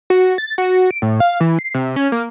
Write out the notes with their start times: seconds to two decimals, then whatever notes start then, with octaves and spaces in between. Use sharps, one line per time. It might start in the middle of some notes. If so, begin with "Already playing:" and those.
0.10 F#4
0.38 A6
0.58 F#4
0.91 D7
1.02 A2
1.20 F5
1.40 E3
1.59 C7
1.74 C3
1.96 C#4
2.12 A#3